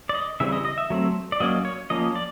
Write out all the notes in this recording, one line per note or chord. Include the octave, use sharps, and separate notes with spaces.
D5
D#5
C#3 E3 G3 C4 E5
D#5
D#5
E5
F#3 A3 C4
D5
F#3 A#3 C#4 D#5
C#5
F3 A#3 C#4 D#5
D5